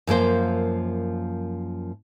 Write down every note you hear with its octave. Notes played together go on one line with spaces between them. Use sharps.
F#2 F3 A#3 C5